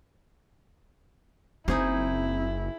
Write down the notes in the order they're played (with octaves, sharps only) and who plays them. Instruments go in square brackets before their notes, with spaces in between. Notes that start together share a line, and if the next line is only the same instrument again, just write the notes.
[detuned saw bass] F#1 [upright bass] C4 [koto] D#4 G#4 C5 [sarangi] E4